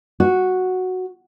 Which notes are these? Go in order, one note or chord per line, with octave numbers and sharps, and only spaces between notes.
F#4